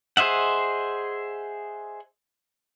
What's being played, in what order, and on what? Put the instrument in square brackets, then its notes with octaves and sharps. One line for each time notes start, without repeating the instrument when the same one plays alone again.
[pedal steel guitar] G#4 C5 D#5 E5 F#5